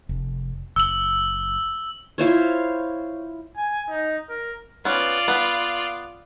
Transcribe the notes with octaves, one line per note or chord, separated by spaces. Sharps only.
F1
F#1 E6 F#7
E4 F4 C5 C#5
G#5
D#4
A#4
B3 C#4 F4 D5
B3 B4